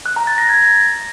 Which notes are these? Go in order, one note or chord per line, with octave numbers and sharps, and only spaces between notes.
F#6
A#5
A6
A#6
G#6